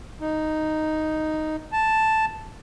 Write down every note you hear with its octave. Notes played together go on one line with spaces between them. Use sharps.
D#4
A5